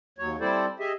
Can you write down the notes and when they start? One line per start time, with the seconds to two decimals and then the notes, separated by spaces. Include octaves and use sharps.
0.18 D#2 F#3 C#5
0.40 G3 C4 E4 A4 C5 D5
0.79 G4 G#4 D#5 E5